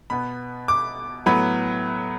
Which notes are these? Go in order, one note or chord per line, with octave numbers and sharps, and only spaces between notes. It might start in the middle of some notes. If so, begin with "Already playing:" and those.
B2 B3 B5
D6
A2 F#3 B3 B5